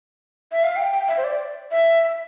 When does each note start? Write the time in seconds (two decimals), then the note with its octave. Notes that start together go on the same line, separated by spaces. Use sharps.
0.52 E5
0.64 F5
0.76 G5
0.93 G5
1.08 E5
1.17 C5
1.24 D5
1.71 E5